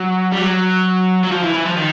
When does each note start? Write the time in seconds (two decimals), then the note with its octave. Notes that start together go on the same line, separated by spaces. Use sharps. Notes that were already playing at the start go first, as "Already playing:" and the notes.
Already playing: F#3
0.33 G3
0.40 F#3
1.24 F#3
1.31 F3
1.43 E3
1.54 E3
1.65 F3
1.77 D#3